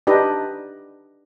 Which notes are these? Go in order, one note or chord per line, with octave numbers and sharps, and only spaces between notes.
D4 D#4 G4 B4 D#5